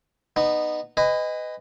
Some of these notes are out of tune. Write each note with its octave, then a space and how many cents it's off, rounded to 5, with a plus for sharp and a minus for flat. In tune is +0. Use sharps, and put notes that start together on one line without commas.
B3 +0 D#4 -25
B4 +25 D#5 +0 G#5 -35